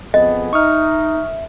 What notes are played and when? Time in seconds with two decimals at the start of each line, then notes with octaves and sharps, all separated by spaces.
0.14 F2 B3 G#4 D#5
0.53 D#4 E5 C#6 D#6 F6